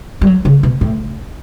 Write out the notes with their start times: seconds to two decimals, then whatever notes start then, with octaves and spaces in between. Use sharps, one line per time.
0.21 G3
0.27 F#3
0.45 C#3
0.63 B2
0.81 A2